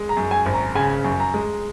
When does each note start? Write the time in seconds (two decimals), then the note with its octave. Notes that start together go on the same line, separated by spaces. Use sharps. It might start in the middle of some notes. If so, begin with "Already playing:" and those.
Already playing: G#3
0.09 A#5
0.17 F#2
0.31 G#5
0.46 G#1
0.54 A#5
0.75 C#3 G#5
1.04 F#2
1.20 A#5
1.34 G#3